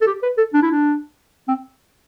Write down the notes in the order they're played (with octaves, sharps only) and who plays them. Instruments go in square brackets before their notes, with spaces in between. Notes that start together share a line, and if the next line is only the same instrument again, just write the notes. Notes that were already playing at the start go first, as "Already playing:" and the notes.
[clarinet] A4
G4
B4
A4
D4
E4
D4
C4